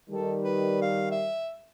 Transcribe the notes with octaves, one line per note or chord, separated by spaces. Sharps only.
D#3 G3 A4
B4
F5
E5